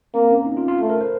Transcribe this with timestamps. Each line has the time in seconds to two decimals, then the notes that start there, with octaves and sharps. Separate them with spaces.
0.14 A#3 C4
0.31 C#4
0.46 D#4
0.57 F4
0.68 F4
0.80 A3
0.90 A#4
1.01 C5